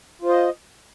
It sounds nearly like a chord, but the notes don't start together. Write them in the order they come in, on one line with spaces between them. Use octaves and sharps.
F4 C5 D#5